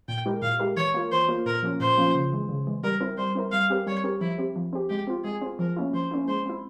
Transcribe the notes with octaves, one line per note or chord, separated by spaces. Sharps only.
A#2 G5
G#3 E4 G4 A#4
A#2 F5
G#3 E4 G4 A#4
E3 C#5
A#3 F4 A#4
E3 C5
A#3 F4 A#4
A#2 A#4
F3 A#3 C#4 F4
A#2 C5
F3 A#3 C#4 F4
C#3
E3 G#3
C#3
E3 G#3
G3 A#4
C4 E4 A#4
G3 C5
C4 E4 A#4
G3 F5
C4 G4 A#4
G3 C#5
C4 G4 A#4
F3 E4
C4 G4
F3
C4 G4
G#3 G4
C4 F4
G#3 G#4
C4 F4
F3 A#4
A#3 C#4 E4
F3 C5
A#3 C#4 E4
G#3 C5
C4 E4